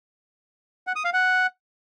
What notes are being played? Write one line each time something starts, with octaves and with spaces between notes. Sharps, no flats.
F#5
D#6
F5
F#5